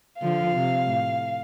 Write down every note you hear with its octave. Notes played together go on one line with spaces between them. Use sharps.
D3 F3 F5
C3
A2